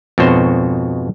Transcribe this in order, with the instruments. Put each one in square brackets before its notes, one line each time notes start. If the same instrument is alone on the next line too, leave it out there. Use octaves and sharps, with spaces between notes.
[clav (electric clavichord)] F2 G#2 B2 F#4 C5 C#5